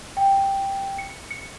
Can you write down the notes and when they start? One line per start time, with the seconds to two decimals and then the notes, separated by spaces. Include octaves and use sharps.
0.17 G5
0.98 C#7
1.31 C#7